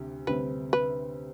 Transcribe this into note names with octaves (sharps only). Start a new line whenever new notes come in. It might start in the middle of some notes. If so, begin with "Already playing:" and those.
Already playing: D2 C3 G3
D2 C3 G3 C4 B4
B4